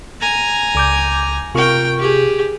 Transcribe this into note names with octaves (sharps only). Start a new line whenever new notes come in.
G#5 A#5
C#2 D6 G6
C3 F4 A#4 G5 C#6
G4 G#4